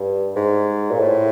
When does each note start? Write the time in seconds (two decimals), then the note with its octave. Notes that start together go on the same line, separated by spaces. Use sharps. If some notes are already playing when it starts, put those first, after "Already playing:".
Already playing: G2
0.36 G#2
0.91 A#2
1.00 A2